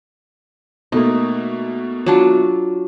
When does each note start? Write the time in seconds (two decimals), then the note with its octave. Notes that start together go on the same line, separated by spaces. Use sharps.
0.92 B2 A3 A#3 D#4
2.06 F#3 D4 F4